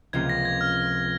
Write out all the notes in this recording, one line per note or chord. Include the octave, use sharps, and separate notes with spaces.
C#2 C3 F3 A#3 F4 G#6
A#6
G#6
F6